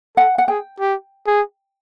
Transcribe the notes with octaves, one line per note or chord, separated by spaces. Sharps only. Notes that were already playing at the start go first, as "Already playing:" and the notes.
A4 F#5
F#5
G#4 G5
G4
G#4